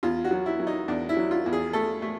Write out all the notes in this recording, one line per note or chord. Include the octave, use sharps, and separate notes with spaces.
E2 F4
F#4
F#3
E4
F#3
D#4
E2 D4
E4
F#3
F4
E2
G#4
A3 A4
A3